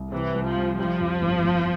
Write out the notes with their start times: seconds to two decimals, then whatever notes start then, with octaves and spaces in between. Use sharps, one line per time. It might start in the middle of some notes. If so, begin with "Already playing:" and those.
Already playing: C2
0.12 C3 E3
0.35 C2
0.46 F3
0.57 C2
0.78 F3 G3
1.00 F2
1.22 G1
1.44 G1